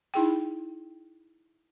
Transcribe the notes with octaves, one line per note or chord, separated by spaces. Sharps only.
D#4 E4 G#4 G5